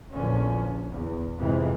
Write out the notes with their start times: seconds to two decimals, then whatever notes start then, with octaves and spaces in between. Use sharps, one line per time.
0.13 A#1 E2 D3 F3 C#4
0.89 E2
1.40 F2 G#2 C3 E3